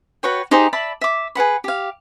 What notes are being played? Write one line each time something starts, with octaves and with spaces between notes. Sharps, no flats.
F#4 B4 C#5 G5
D#4 G4 G#4 C5
D5 E5 A5 B5
E5 D6
G#4 B4 F#5 B5
G4 F5